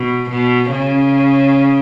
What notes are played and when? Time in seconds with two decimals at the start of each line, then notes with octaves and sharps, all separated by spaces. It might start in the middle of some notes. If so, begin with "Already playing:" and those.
Already playing: B2
0.30 B2
0.71 C#3